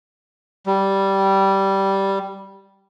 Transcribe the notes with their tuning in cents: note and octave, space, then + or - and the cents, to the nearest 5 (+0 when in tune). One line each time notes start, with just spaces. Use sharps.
G3 -10